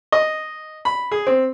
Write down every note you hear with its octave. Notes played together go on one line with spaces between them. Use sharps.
D#5
B5
G#4
C4